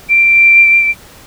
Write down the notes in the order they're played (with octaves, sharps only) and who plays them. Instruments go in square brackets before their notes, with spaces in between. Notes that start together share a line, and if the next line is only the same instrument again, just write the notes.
[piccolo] D7